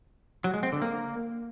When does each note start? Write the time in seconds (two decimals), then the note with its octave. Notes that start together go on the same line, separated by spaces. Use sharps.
0.44 F#3
0.54 G#3
0.63 C4
0.72 D3
0.82 A#3